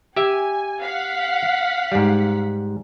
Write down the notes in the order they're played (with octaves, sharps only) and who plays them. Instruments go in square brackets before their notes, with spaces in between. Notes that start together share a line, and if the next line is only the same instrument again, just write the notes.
[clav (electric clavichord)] G4 E5 [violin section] G#5
[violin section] F5 F#5 B6
[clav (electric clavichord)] G#2 G3